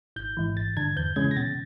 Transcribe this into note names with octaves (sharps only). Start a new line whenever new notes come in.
G#1 G6
G#2 E3
A1 A6
G2 D3 G#6
E2 G6
C#3 E3 G#3 C#4 G#6
A#6
B2 A6